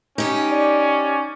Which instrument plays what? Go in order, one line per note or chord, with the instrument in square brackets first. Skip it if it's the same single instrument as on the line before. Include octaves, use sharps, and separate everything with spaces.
[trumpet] C#4 [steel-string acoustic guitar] D#4 G4
[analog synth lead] D5